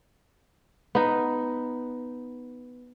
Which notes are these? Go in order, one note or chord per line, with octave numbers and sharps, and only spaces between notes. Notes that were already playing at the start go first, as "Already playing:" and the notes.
B3 D#4